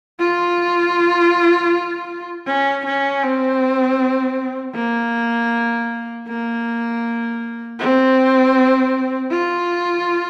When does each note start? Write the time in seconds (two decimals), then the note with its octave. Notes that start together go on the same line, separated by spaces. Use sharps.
0.20 F4
2.47 C#4
2.85 C#4
3.23 C4
4.76 A#3
6.28 A#3
7.79 C4
9.32 F4